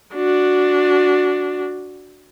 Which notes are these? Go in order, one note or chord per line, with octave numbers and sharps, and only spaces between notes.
D4 F#4